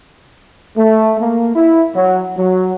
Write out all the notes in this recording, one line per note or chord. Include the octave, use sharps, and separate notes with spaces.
A3
A#3
E4
F#3
F#3